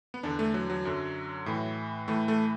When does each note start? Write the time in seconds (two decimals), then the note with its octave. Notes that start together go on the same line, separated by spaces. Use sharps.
0.14 B3
0.23 E2 D3 D4
0.39 A3
0.54 F#3
0.70 F#3
0.85 F#2 D3
1.46 A2 E3
2.08 A2 E3 A3
2.28 A3